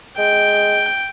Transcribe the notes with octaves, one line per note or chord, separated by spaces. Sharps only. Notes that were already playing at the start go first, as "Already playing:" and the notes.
G#3 G5